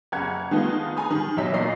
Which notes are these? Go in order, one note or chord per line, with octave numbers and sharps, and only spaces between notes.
F#1 F#5 G#6
D#3 G#3 A3 B3 D#4 F4
G#4 G#5 A#5 B5 D#6
D#3
E2 F#3 D#5 E5 B6
A#2 A#3 D5 D#5 C#6 C7